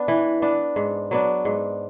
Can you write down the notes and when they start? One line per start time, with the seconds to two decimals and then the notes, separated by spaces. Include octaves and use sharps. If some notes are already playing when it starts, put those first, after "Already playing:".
Already playing: B3 D4
0.08 E3
0.42 B3 D4
0.76 G#2
1.11 F#3 B3 D4
1.45 G#2